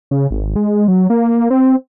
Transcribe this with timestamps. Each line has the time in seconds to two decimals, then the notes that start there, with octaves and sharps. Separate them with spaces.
0.11 C#3
0.31 G#1
0.56 G#3
0.88 F#3
1.10 A#3
1.50 C4